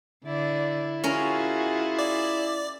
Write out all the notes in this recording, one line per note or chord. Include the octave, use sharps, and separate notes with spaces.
D3 E4 D5
C#4 F4 F#4 G#4 A#4
D5